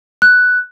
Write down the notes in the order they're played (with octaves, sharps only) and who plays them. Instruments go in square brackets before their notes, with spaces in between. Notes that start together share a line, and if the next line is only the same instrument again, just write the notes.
[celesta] F#6